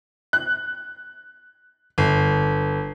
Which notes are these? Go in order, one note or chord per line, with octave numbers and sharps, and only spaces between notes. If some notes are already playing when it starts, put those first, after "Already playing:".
F#6
G1